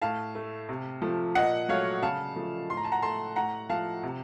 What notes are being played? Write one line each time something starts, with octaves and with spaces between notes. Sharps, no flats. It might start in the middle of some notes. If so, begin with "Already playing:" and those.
A2 F5 A5
A3
C3
F3 A3
A#2 D#5 F#5
F#3 A3 C#5 F5
C#3 F5 A5
F3 A3
A2 C6
A#5
A5
F#5 A#5
A3 A5 C6
A2 F#5 A#5
F3 A3 F5 A5
C3